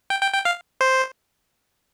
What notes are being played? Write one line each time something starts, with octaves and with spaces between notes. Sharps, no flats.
G5
G5
G5
F5
C5